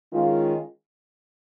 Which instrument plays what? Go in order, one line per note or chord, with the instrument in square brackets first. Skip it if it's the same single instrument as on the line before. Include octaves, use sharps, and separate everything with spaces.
[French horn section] D#3 G#3 C#4 F4